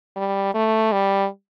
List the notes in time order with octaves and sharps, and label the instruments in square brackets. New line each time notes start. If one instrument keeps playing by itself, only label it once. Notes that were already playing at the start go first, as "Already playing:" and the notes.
[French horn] G3
A3
G3